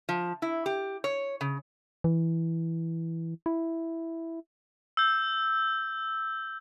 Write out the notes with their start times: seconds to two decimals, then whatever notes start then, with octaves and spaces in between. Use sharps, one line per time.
0.09 F3
0.42 E4
0.66 G4
1.04 C#5
1.41 C#3
2.04 E3
3.46 E4
4.97 E6 G6